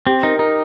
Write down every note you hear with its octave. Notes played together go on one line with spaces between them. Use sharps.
C4 G4
D#4 A#4
D#4 A#4